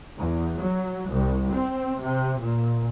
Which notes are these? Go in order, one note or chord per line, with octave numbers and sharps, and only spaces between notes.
E2
F#3
C2
C4
C3
A#2